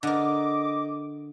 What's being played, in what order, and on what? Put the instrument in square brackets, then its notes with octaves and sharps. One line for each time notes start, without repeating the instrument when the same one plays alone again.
[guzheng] D3 A#4 [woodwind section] D#5 D6